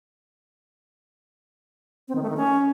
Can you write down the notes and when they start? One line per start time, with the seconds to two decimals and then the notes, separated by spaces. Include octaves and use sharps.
2.08 C4
2.15 D#3
2.23 A3
2.30 D#3
2.37 C#4